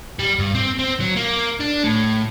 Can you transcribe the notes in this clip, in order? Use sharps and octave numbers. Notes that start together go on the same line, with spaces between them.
G3
G2
C4
C4
F#3
A#3
D4
A2